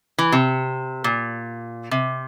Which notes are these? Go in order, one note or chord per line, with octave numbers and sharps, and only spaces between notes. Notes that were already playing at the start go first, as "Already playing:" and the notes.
E3
C3
A#2
C3